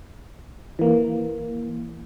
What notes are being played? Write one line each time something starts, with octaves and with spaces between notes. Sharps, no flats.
E3 A#3